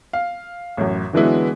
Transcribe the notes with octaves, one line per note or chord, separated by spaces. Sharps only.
F5
A1 F#2
D3 E3 F#3 G#3 B3 E4